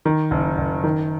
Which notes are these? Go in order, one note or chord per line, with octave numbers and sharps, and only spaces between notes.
D#3
F#1
F#1
D#3